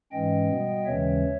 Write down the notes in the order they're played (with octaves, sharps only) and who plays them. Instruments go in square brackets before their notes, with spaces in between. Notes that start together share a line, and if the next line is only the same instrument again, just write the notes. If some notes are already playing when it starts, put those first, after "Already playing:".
[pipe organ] G#2 E3 G#3 C#4 D#5 G5
B2 G3 B3
D#2 C#3 E3 G#3 C#4 C#5 E5